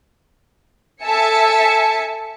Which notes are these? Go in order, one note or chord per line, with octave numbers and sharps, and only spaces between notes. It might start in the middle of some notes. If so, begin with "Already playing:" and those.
A4 E5 G#5 A5 C#7